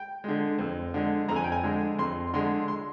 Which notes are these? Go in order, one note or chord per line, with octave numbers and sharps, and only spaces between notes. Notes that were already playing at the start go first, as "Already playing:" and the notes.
Already playing: G5
D3 G#3
F2
D3 G#3
F2 A#5
G#5
G5
G#5
D3 G#3
F2 C6
D3 G#3 C6
C6